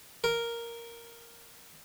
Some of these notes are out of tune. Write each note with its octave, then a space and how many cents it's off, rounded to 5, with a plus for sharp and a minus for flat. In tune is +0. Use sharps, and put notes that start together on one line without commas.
A#4 +0